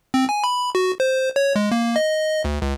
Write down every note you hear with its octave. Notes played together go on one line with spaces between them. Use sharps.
C4
G#5
B5
F#4
C5
C#5
G#3
A#3
D#5
D2
C#2